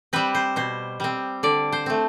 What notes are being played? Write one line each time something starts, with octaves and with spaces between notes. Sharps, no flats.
G3 C4 B4
C5
B2 C5
G3 C4
D3 D5
C5
A3 C4